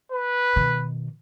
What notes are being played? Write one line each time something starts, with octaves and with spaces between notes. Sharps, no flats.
B4
B2 D#3